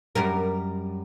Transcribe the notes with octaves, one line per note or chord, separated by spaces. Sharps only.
F#2 G3 A#4